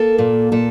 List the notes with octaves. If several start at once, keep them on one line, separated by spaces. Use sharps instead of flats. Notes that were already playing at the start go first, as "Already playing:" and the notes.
Already playing: A#3 A4
A#2
A#2 A4